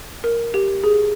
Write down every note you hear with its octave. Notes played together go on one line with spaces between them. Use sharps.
A#4
G4
G#4